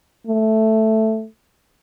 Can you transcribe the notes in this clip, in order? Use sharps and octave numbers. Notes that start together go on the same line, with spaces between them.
A3